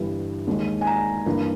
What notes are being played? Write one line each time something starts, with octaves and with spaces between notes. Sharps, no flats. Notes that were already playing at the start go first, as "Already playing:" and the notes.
Already playing: G1 G2 E3 G3
D#2 D#3 G#3
G#5
A#5
G2 E3 A#3